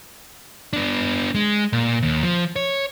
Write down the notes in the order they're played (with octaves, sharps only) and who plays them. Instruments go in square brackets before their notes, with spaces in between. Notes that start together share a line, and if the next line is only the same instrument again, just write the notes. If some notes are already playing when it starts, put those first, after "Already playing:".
[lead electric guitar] B3 D4
G#3
A#2
D#2
F3
C#5